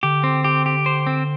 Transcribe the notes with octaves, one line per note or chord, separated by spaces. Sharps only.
D3 G4
C4
G4
G4
C5
C4